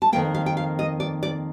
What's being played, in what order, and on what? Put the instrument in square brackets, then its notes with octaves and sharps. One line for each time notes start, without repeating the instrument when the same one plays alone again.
[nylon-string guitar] A5
F2 D#3 A#3 G5
F5
G5
F5
D#5
D5
D5